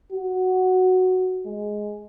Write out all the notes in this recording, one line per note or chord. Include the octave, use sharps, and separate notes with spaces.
F#4
G#3